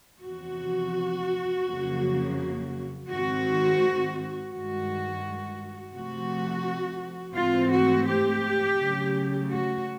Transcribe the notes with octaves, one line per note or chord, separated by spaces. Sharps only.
E2 C3 F3 F#4
F2 C#3 F#3 A#3
G#2 D#3 G#3 C4 F#4
G2 D#3 G#3 F#4
C3 F3 A3 F#4
G#2 E3 A3 C4 F4
F#4
G4
C#3 F#3 A3
F#4